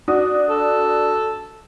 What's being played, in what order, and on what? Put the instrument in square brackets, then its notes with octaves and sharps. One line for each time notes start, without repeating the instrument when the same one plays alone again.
[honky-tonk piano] D4 F#4 D#6
[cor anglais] A4